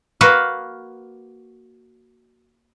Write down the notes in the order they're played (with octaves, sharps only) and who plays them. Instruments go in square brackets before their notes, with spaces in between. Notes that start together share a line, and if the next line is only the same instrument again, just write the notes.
[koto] A#3 F#4 B4 F5